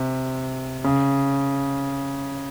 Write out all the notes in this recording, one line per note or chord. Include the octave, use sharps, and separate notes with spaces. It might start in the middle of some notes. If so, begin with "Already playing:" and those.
Already playing: C3
C#3